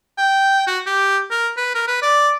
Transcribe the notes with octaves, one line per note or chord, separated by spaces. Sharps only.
G5
F#4
G4
A#4
B4
A#4
B4
D5